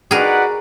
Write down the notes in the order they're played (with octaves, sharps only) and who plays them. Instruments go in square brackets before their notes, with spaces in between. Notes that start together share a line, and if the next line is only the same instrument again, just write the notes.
[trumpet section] D#4 F#4 B4 D5 F#5 [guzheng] G#4 A#4